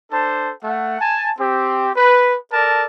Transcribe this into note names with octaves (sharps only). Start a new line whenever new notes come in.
D4 A4 C5 A5
A3 F#5
G#5 A5
C4 G4
B4
A4 A#4 D5 A5